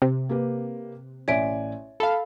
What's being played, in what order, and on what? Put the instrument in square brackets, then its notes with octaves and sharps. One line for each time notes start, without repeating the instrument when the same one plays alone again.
[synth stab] C3
[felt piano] A#3 G4 B4
[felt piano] A1 D5 G#5 [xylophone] C#5 E5 D7
[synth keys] A4 F5 [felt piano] A5 B5